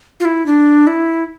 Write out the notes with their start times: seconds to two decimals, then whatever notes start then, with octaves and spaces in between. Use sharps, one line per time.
0.20 F4
0.25 E4
0.46 D4
0.87 E4